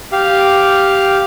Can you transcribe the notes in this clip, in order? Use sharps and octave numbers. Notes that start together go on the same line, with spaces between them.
G4 F5